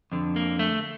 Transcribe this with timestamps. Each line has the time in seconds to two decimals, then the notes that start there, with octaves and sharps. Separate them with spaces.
0.12 F2 D3
0.36 A#3
0.59 A3